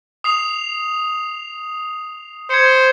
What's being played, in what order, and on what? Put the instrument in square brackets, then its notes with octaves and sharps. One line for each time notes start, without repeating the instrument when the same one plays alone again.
[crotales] D#6 C7 F7
[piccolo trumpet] C5 [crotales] G#6 C#7